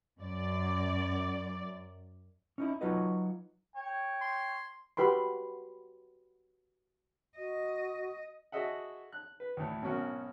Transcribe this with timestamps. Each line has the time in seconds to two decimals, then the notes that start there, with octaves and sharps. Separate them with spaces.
0.20 F#2 D5
2.58 C#4 D#4 E4
2.81 F#3 D#4 F4 F#4 B4 D#5
3.76 C#5 G5
4.22 C6
4.97 F#4 G4 B4 B5 C6
7.38 F#4 D#5
8.52 F#4 G#4 A4 D#5 E5 F#5
9.12 F#6
9.40 B4
9.57 D2 A2
9.82 G#1 B2 F#3 C#4 F#4 A#4